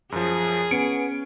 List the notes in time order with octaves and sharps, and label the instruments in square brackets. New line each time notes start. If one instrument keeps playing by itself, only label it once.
[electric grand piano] F#2 F3 [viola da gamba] G#4
[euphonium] B3 [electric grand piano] C#4 C#7 D7